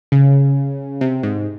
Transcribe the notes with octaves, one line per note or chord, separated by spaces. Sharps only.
C#3
C3
G#2